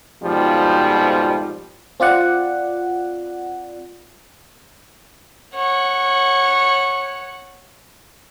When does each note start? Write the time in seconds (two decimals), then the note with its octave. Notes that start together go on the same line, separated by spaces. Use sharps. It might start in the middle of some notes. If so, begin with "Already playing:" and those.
0.23 F2 G#2 B2 F3 G3
2.00 C4 F4 D5 F#5
5.55 C#5 F#5